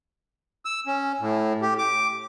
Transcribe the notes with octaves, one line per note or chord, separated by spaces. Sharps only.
E6
C#4
A2
G4
D6